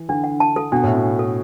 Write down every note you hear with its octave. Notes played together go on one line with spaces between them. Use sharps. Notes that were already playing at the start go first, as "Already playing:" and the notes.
Already playing: E3
D3 D4
F#5
A5
A4
B2 D4
A2 E5
B2
D4
A4